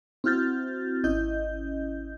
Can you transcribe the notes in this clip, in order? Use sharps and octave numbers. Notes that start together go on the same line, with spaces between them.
C4 E4 F#4 F6 G6 A6
G#1 C#4 E4 D#5 G6